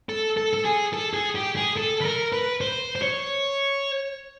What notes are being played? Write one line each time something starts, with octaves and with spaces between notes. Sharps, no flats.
A4
A4
A4
G#4
A4
G#4
G4
G#4
A4
B4
A#4
B4
C5
C5
C#5